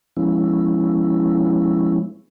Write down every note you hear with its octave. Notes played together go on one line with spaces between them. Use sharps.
F3 G#3 B3 C#4 E4